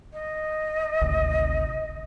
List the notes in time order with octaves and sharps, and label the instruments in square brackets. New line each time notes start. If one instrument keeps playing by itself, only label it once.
[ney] D#5
[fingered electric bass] G#1 D2 C3